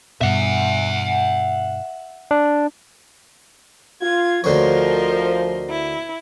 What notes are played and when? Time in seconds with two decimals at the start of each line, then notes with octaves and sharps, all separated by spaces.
0.21 G2 B2 E5 F#5
2.31 D4
4.02 F4 G#6
4.44 D2 D3 F3 A#4 C5 C#5 D#5
5.70 E4